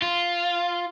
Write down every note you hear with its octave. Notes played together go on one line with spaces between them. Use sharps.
F4